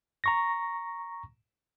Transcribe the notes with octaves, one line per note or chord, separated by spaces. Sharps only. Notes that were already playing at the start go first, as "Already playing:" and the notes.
A#5 C#6 A#6